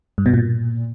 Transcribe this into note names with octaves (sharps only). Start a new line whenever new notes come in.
G2
B2
A#2